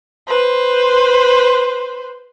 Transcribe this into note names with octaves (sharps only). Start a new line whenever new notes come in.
B4 C5